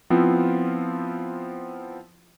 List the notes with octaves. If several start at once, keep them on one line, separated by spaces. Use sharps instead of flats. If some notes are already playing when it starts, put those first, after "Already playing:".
F3 B3 C4 E4 F4